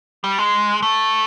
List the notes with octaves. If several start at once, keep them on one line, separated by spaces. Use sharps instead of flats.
G3
G#3
A3